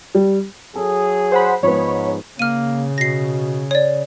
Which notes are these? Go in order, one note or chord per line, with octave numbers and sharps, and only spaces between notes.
G3
F#3 G#4 A4
C5 F#5 B5
G#2 F3 G#3 B3 C#5 B5
C#3 A#3 F6 D#7
B2 A#6 C7
C#5 D5